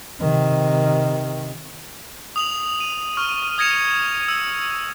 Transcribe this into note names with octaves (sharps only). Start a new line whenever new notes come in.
C3 D#3
D#6 F7 F#7
D#7
C#6 F6 D#7
D#6 G#6 A#6 C#7 E7 F7
E6